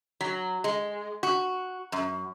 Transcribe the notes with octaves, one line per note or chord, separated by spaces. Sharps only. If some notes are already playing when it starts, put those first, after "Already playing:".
F#3
G#3
F#4
F#2